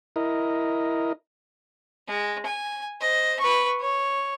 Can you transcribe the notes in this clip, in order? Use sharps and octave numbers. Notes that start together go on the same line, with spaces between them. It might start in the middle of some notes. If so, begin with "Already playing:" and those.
E4 A#4 D#5
G#3
G#5
C5 D#5
B4 C#6
C#5